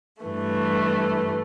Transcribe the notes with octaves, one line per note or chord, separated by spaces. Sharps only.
G2 E3 A3